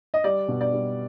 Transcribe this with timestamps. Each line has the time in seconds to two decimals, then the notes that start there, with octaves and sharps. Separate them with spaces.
0.14 D#5
0.24 G3 D5
0.48 B2
0.61 D5
0.73 G3